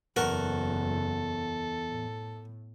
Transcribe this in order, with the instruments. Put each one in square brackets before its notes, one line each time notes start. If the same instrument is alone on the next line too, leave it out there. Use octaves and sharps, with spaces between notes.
[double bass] F#1 [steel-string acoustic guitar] E2 [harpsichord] F#4 A#4 [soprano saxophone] A4
[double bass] A2